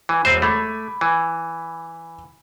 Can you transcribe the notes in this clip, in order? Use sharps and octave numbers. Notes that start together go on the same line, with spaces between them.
E3
E1 C4 C5 D#7
A3 B5 D6 G#6
E3